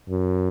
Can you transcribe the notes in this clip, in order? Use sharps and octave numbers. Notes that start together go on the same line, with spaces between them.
F#2